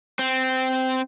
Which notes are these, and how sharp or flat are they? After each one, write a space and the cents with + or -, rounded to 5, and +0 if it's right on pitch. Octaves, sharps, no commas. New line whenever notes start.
C4 -10